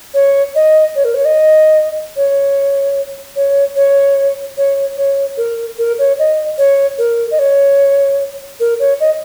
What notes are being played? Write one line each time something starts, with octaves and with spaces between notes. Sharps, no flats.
C#5
D#5
C#5
A#4
C#5
D#5
C#5
C#5
C#5
C#5
C#5
A#4
A#4
C#5
D#5
C#5
A#4
D#5
C#5
A#4
C#5
D#5